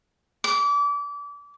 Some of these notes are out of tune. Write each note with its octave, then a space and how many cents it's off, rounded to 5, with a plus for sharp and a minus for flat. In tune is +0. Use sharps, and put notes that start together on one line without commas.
D6 -30